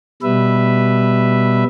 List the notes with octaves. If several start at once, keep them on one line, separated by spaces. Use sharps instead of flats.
B2 G3 B4 E5